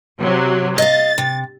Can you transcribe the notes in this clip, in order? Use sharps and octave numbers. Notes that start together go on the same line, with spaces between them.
C3 F#3
D#5 F5 A6
C3